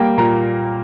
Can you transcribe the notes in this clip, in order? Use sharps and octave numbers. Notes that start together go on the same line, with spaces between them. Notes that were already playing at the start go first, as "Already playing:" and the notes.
Already playing: G3 A#3 G5
A#2 A#5